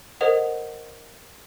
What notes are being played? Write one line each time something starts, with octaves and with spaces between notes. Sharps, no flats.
A4 A#4 C5 D#5 F#5 D#6